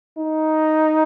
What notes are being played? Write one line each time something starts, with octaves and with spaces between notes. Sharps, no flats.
D#4